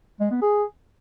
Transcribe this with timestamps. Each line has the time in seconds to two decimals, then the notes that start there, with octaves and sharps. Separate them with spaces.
0.21 G#3
0.31 B3
0.42 G#4